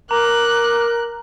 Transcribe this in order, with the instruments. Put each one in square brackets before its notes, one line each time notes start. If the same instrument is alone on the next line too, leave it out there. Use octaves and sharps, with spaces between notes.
[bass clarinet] A#4 [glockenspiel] A#5 [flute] D6 [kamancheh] F#6